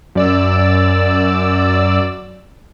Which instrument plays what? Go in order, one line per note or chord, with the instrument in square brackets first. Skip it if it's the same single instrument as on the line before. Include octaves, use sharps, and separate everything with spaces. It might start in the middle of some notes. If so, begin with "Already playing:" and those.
[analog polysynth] F#2 D5 E6